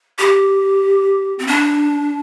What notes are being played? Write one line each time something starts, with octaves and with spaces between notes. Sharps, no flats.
G4
C4
D4